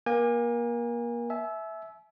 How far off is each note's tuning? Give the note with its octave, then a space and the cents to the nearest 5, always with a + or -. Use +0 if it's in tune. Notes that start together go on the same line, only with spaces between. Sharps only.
A#3 +30 G#5 -30
E5 -5 G#5 +45